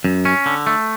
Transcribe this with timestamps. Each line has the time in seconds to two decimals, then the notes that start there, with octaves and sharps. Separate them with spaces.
0.04 F#2
0.25 C#4
0.46 D3
0.67 A3